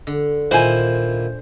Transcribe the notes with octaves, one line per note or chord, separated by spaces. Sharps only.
D3
A#2 D#3 E4 C5 G#5